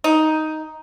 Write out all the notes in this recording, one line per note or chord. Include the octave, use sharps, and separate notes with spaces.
D#4